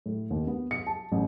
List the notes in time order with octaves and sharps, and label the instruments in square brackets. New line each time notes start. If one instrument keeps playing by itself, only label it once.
[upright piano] A2
D#2
B3
C#7
A5
A1